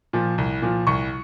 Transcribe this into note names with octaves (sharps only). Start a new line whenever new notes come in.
A#2 F3
C2
A#2 F3
C2 C#6